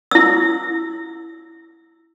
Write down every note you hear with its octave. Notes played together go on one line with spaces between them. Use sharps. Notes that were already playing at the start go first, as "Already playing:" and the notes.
E4 E6